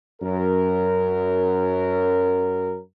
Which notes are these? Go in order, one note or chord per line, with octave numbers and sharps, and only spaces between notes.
F#2 A#4